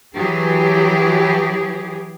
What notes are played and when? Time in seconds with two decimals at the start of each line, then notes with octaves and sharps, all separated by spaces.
0.16 E3 F#3 G4 G#4